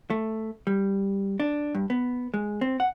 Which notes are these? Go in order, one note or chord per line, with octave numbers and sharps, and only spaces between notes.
A3
G3
D4
G2
B3
G#3
C4
F#5